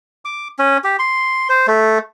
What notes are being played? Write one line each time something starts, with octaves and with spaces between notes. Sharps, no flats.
D6
C#4
G4
C6
C5
A3